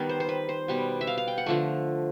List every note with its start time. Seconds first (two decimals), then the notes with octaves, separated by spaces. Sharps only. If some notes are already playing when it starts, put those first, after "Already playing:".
Already playing: D#3 G3 B3
0.09 C5
0.20 C5
0.29 B4
0.49 C5
0.68 B2 G3 B3
1.01 E5
1.07 F5
1.18 F5
1.28 G5
1.38 F#5
1.46 D3 F3 A3